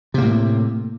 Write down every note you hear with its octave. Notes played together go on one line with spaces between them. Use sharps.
A2 C3 A#3